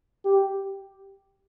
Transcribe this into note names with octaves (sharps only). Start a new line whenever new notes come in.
G4